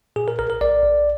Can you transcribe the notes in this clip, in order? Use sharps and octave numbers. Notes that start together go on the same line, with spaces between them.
A#2 G#4
A#4
A#1 A#4
A#4
A#1 D5
A#1